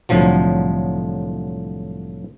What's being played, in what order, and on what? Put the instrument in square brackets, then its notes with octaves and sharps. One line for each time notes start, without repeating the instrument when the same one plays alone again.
[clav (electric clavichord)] C2 A2 D3 F3 F#3